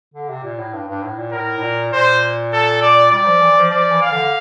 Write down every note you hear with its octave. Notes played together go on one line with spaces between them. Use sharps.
D3
C3
A#2
A2
G2
G2
A2
A#2
A2 A#4
A2
A#2
A#2 C5
A4
D5
G3 D5
F3
E3
F3
F3 D5
E3
F5
D3